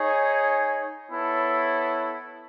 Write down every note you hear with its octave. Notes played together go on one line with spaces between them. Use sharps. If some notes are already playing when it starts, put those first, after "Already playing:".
Already playing: D#4 G#4 C#5
B3 E4 A4 C#5